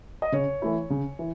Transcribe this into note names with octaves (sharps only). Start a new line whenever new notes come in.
D#5
C#3 C#5
E3 A3 E4
C#3
E3